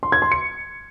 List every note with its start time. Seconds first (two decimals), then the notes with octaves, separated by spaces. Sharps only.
0.03 C6
0.12 G#6
0.22 C6
0.32 C#7